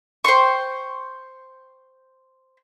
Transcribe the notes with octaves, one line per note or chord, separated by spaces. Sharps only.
C5 G5 C6 C#6